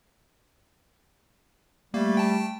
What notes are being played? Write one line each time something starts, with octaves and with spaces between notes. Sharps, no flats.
G3 A3 A#3
G5 A5